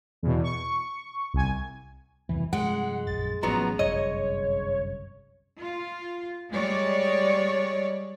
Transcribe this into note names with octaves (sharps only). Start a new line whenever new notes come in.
E2 B2
C#6
C2 G#5
C2 F2 B2 E3
G2 C3 F3 G#3 F#5
A#1 F#2 A6
A1 F3 F#3 B3 C#4 A#5
G1 C2 F#2 C#5 D#5
F4
G3 G#3 C#5 D5